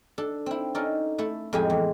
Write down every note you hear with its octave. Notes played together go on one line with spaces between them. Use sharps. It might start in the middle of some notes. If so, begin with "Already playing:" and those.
D4 A4
C4 E4
C#4 D#4 A4 A#4 D5
A3 E4 A4
F2 A2 G#3 G4 G#4 G#5
E2